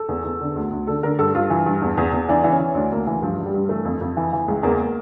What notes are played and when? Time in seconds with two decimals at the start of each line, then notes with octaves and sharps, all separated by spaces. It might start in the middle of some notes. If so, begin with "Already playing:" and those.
Already playing: A4
0.09 E2
0.25 E2
0.41 D3
0.56 D2
0.71 D2
0.87 D3 A4
1.03 D3 A#4
1.19 G2 A4
1.35 G2 F4
1.50 E3
1.66 G2
1.82 E2
1.97 E2
2.12 E2
2.29 E3 D4
2.44 E3
2.52 C#4
2.59 E3
2.75 D2 D4
2.92 D2 A#3
3.07 D2 E3
3.22 G2 F3
3.38 G2
3.45 G3
3.54 G2
3.69 E3 A3
3.85 F2
4.01 F2
4.17 E3
4.33 E3
4.48 C#2
4.63 E2 A#3